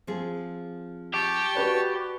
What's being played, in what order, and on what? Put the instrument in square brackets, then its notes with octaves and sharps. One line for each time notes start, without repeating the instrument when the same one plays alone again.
[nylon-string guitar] F3 C4 G#4
[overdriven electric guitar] G4 [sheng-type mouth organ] A5 C#6
[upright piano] F#4 B4 D5